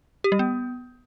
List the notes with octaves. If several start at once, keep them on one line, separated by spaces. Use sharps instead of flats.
G4
G3
B3